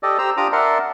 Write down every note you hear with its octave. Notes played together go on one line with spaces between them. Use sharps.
G4 A4 D5 D#5
G4 C5 A#5 E6
D4 F4 G4 A#5 D6 D#6
A#4 D5 E5 F#5 A5 C6